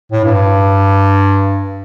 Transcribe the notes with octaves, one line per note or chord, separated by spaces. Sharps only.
A2
G2